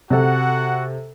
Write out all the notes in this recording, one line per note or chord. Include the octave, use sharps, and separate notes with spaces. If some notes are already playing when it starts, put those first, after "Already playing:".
C3 F#4 A4 F#5